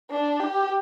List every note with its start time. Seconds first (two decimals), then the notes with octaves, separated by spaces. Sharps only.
0.11 D4
0.40 G4